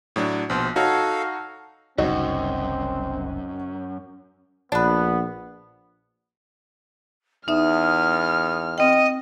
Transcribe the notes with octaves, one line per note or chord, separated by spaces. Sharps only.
A2 F#3 D4
A#1 B2 C5
D#4 F#4 A4 C#5 F5
F#1 C2 F#2 C4 D#4 F#4
A#1 B3 D4 B4
E2 D#4 E5 D#6 F6
C4 D#5 G5